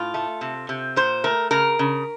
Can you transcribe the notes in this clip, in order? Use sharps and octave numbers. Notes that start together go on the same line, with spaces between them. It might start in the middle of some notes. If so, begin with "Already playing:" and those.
Already playing: A2 F4
A3
C3
C3
A#2 C5
A3 A#4
C#3 A#4
C#3